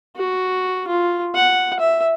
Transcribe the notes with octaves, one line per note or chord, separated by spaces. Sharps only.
F#4
F4
F#5
E5